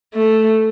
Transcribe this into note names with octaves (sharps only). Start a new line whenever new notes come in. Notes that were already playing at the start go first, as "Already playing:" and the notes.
A3